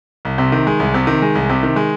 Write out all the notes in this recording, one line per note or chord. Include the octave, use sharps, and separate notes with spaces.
C2
C3
D#3
G#3
C2
C3
D#3
G#3
C2
C3
D#3
G#3